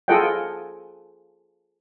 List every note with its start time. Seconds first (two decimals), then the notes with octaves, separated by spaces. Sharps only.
0.08 F4 G#4 A4 D#5 F#5 G5